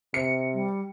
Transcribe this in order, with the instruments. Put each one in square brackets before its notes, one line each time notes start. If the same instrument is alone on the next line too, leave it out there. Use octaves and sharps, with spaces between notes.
[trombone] C3 [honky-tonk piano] C#7
[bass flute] G3